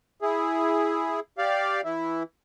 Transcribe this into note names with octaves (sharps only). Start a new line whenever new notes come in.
E4 G#4
G4 D5 F5
E3 E4